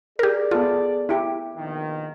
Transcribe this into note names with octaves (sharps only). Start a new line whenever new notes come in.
G4 G#4 A#4 D5
B3 F4 A4
E4 G4
A#1 B2 D#3